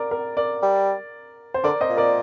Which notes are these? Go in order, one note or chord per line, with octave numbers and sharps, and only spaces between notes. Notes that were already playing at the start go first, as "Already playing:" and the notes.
Already playing: A#4 D5
A#4
A#4 D5
G3
C5
D3 A#4 D5
C5 D#5
A#2
A#4 D5